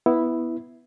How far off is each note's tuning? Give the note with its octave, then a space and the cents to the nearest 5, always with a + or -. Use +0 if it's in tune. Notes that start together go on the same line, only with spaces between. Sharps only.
B3 +0 E4 -5